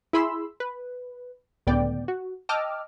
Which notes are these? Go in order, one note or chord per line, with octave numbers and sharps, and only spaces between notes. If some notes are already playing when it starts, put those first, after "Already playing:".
E4 G#4 B5 C6 E6
B4
C#2 A2 D3 B3 D5 G5
F#4
D#5 G5 A5 D6 E6 F6